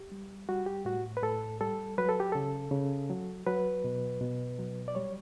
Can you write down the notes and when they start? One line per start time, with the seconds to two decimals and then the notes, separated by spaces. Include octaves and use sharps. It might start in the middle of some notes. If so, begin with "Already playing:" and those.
Already playing: G4
0.12 G3
0.49 G3 F#4
0.66 G4
0.85 A2 F#4
1.17 B4
1.22 A2 A4
1.61 G3 A4
1.98 F#3 B4
2.09 A4
2.20 G4
2.32 C#3 A4
2.71 C#3
3.10 F#3
3.46 F#3 B4
3.84 B2
4.21 B2
4.59 F#3
4.88 D5
4.95 G3 C#5